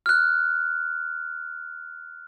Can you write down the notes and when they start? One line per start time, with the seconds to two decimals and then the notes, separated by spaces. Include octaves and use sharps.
0.06 F6 F#6